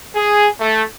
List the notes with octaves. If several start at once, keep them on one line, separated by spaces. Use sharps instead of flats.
G#4
A3